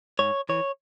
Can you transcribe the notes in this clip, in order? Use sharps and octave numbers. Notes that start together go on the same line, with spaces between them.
G#2 C#5
E3 C#5